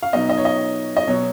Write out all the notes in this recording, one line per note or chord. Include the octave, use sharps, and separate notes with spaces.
F5
B2 F#3 B3 D#4 D#5
D#5
C#5
D#5
D#5
B2 F#3 B3 C#5